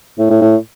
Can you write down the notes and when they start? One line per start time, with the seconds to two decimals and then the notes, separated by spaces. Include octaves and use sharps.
0.19 A2
0.30 A2
0.41 A2